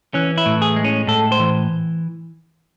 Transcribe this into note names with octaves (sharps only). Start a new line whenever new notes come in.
E3 C#4
E4
A2
G#4
G#3
C#4
A2 A4
C5
E3